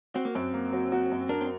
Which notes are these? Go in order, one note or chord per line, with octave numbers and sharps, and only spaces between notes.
C4 F#4
A#3
F#2 C4
A#3
F#3
F#4
F#2
D4 A#4
C4